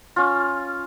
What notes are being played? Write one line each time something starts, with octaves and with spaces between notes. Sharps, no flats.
C#4 F4